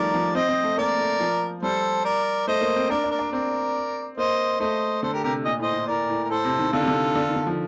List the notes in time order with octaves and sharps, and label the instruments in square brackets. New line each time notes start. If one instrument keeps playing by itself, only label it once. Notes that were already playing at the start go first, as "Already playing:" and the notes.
Already playing: [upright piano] D#3 F3 G3 A3 [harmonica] A#4 D5
[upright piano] F3
[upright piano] C4 [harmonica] C5 D#5
[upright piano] C4
A3
[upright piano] A#3 [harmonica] A#4 D5
[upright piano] A3
F3
[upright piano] G3 [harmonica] A4 C5
[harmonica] A#4 D5
[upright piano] A3 [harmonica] C5 D#5
[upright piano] A#3
C4
[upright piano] D4 [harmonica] A#4 D5
[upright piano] D4
[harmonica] A#4 D5
[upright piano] D4
[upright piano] C4 [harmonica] A#4 D5
[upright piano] A#3 [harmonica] C5 D#5
[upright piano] A3 [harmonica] C5 D#5
[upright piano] D3 [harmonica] A4 C5
[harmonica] G4 A#4
[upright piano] C3 [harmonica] G4 A#4
[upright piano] A#2 [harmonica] D#5
[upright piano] A2 [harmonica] C5 D#5
[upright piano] A2
[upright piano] A2 [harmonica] A#4 D5
[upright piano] A2
[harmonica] A#4
[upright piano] A2 [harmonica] A4 C5
[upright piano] C3
D#3
[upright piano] D3 [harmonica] F4 A4
[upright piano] C3
D3
D3
D#3
D3
F3